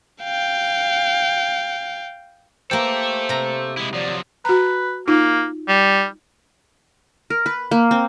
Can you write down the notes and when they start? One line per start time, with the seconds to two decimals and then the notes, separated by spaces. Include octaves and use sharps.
0.23 F5 G5
2.71 A#3 G4 A4 C5 E5
3.29 C3 A#5
3.77 G#3 E4
3.94 F3 F#3 D5
4.45 F#4 B4 A#5
5.08 A#3 D#4 F4
5.68 G3
7.30 A#4
7.46 B4
7.71 A#3
7.91 C4